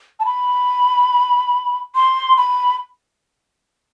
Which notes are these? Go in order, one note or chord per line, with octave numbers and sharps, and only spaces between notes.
A5
B5
C6
B5